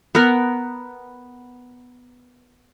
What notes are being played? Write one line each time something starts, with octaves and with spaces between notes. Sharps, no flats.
B3 A#4